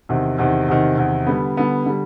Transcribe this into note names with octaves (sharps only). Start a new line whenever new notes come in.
E2 C3 D#3
E2 C3 D#3
E2 C3 D#3
E2 C3 D#3
D3 G3 B3
D3 G3 B3
D3 G3